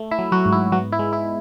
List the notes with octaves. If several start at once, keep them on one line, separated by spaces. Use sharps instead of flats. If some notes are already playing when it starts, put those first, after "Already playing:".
Already playing: A3
E4 E5
F#3
F#3 F#4
G#2
E4
F#3 B3 F#4
E4
G#3
E4